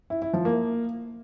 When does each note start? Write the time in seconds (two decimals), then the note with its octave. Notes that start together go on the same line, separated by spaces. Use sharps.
0.10 E4
0.22 E4
0.33 F3
0.45 A#3